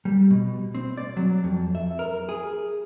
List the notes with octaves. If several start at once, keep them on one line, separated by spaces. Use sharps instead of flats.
G3
B2
C4
D5
F#3
F2
E5
A#4
G#4